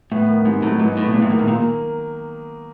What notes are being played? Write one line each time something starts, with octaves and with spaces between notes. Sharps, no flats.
A2 B3
D#3
G#2 C3
A2 F#3
G#2 B3
A2 B3
B2
A#2 G#3
A2
G#2 D#3
A2
A#2 A#3